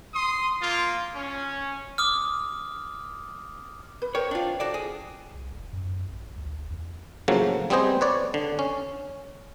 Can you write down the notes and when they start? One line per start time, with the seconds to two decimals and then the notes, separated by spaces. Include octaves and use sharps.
0.14 C6 D#6
0.61 A#3 F4
1.15 C#4
1.98 D6 D#6 F6
4.02 B4
4.15 A#4 C5 C#5 G5
4.31 D4 F4
4.60 F#4 A4 D5
4.74 G#4
5.35 C2
5.52 E1
5.73 F#2
6.07 A#1
6.23 A#1
6.38 D2
6.57 F1
6.71 E2
7.28 A2 C#3 F3 F#3 A#3
7.70 G3 B3 C4 G#4 C5 D#5
8.01 B4 C#5 D5
8.34 D3
8.59 C#4